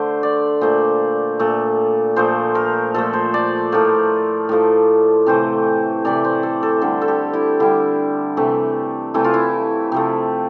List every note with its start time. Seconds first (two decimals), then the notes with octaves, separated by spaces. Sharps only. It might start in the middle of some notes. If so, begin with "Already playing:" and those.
Already playing: D3 A3 C5
0.23 D5
0.61 A#2 A3 C5
1.39 A#2 A3
2.16 A#2 F3 A3 C5
2.55 A#4
2.94 A#2 F3 A3 A4
3.13 C5
3.34 D5
3.72 A2 F3 A3 A#4
4.49 A2 F3 A3
5.26 C3 E3 A3 C5
6.05 C3 E3 A3 D5
6.25 C5
6.43 A4
6.63 A4
6.81 D3 G3 A4
7.01 A4
7.08 G4
7.34 E4
7.60 D3 G3 E4
8.37 C3 E3 A3
9.14 C3 E3 A3 E4
9.24 F4
9.34 E4
9.92 C3 F3 A3